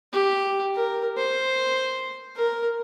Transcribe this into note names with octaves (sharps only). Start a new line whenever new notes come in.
G4
A#4
C5
A#4